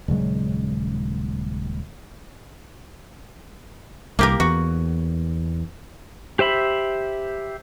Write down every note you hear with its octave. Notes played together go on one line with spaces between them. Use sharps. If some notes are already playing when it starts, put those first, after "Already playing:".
D#1 C#3 F#3 G#3
C2 A#3 G4 A#4
E2 F#4
G4 C5 E5 B5